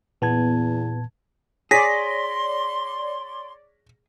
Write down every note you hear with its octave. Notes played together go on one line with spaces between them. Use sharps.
E2 A#2 B3 A5 G#6
G#4 C#5 D5 C6 A#6 B6